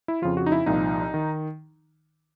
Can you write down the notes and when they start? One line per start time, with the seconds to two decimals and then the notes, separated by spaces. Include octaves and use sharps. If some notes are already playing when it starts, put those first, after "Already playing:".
0.08 E4
0.22 F2 C#3 F3 F4
0.37 F#4
0.46 D#4
0.52 E4
0.66 C2 A#2 F3 D#4
1.14 D#3